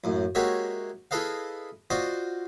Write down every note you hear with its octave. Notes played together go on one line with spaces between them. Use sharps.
A1 F#2
G#3 A#3 F#4 G4 C#5 E5
E4 G#4 A4 B4 D#5 F5
F4 F#4 C5 D5 D#5